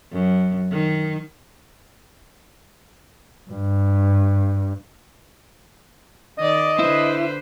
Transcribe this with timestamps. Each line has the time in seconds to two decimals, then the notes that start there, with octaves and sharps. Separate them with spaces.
0.13 F#2
0.72 D#3
3.50 G2
6.38 D#3 D5 D#5
6.79 D3 E4 B4 C5